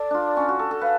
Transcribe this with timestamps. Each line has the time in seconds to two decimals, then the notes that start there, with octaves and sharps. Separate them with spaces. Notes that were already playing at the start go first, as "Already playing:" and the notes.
Already playing: A4 D5
0.11 D4 F4
0.37 C#4
0.49 F#4
0.59 A4
0.71 A4
0.81 B4 F5